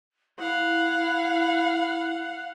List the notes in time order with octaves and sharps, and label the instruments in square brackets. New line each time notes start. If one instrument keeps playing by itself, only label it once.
[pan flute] E4 [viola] F5 F#5